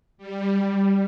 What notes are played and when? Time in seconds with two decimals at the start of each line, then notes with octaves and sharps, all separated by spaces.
0.18 G3